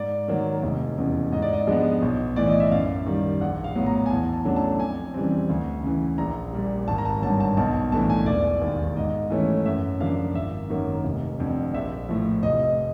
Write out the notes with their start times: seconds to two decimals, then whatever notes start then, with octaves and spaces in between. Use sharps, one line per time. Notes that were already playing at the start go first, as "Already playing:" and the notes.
Already playing: G#2 D5
0.28 D#3 F#3 A#3
0.63 F1
0.98 E2 C#3
1.32 G#2 D#5
1.42 D5
1.53 D#5
1.67 F3 G#3 B3 D4
2.02 B1
2.36 A2 E3 D5
2.48 D#5
2.60 E5
2.71 F#2 F5
3.06 D#3 G3
3.41 A#1 F#5
3.64 F5
3.75 A2 F#3 B3
3.86 A#5
4.06 G#5
4.10 E2 A5
4.33 A5
4.45 C#3 F#3 A3 D4
4.56 A5
4.80 F2 G#5
5.14 C#3 E3 G3 C4
5.50 D2
5.83 C#3 E3
6.18 A#1 A#5
6.53 A#2 G3
6.88 G#1 A5
6.98 A#5
7.05 A5
7.22 G2 D3 F#3 A5
7.40 A5
7.57 B1 A5
7.74 A5
7.92 A2 E3 A3 D4 A5
8.10 G#5
8.26 E1 D5
8.62 D#2 D#3
8.97 G#2 D#5
9.30 E3 A3 C#4
9.66 F#2 E5
10.00 C#3 F3 A#3 D4 F5
10.35 G#1 E5
10.70 F#2 D#3 F#3 A#3
11.04 F1
11.39 F2 D3
11.74 A#1 E5
12.09 A2 F3
12.43 F1 D#5